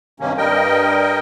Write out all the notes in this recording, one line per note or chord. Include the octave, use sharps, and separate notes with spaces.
G2 C3 D#3 A#3 C#4
G2 G3 A#4 D#5 G5